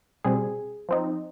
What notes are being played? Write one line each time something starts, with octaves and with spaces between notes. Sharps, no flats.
B2 G3 C4 G#4
F3 C4 D#4